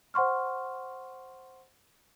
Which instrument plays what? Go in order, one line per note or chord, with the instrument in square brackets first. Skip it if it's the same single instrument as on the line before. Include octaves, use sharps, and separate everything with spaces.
[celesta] C5 F#5 C6 C#6 F6